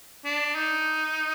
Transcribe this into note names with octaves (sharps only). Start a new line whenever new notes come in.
D4
D#4